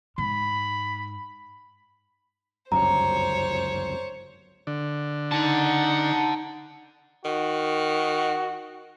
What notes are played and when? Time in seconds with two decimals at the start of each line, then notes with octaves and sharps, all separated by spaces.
0.18 G#2 B5
2.72 G1 C#2 F#2 C5 C#5 A#5
4.67 D3
5.31 D#4 F#5 A5
7.25 D#3 F#4